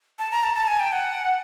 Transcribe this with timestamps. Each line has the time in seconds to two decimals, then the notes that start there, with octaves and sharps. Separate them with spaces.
0.19 A5
0.31 A#5
0.44 A5
0.55 A5
0.67 G#5
0.80 G5
0.92 F#5